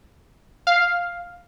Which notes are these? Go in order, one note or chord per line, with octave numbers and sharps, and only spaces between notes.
F5